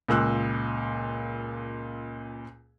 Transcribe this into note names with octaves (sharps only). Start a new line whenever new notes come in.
C#2 A#2 E6 F#6